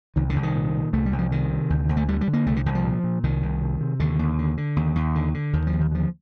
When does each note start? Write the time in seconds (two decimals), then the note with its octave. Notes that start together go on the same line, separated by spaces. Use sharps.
0.16 C2 D#3
0.30 D3
0.36 C2
0.43 D#3
0.55 A#2
0.74 A#2
0.93 C2 A3
1.06 G3
1.12 C2
1.18 F3
1.31 C3 D#3
1.51 C3
1.70 D2
1.89 D2
1.97 A3
2.08 D3 G3
2.21 G3
2.27 D3
2.33 A#3
2.46 C2 A3
2.56 D3
2.66 C2 D#3
2.75 F3
2.84 A#2
3.04 A#2
3.23 C2 D#3
3.42 C2
3.62 C3
3.81 C3
4.00 D#2 D3
4.19 D#2
4.39 D3
4.57 D3
4.76 D#2
4.95 D#2
5.15 D3
5.34 D3
5.53 D#2 D#3
5.67 F3
5.73 D#2
5.81 D#3
5.91 D3 F3